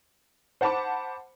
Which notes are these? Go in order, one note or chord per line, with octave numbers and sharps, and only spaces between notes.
C5 F#5 A5 B5 D6